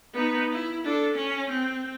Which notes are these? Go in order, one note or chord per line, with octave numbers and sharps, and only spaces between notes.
B3 D#4
E4
D4 A4
C#4
C4